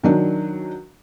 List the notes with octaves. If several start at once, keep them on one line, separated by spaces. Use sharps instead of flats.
D#3 F#3 D4